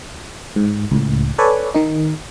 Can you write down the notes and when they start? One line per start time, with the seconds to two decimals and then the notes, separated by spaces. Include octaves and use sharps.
0.56 G#2
0.91 C#2 A2
1.38 A4 B4 C#5 D5 G#5
1.74 D#3 D#4